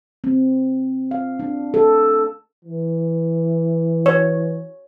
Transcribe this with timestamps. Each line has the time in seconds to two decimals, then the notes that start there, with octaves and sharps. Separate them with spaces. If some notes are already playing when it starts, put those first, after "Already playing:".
0.24 C4
1.11 F5
1.40 D4
1.74 A4
2.65 E3
4.06 C#5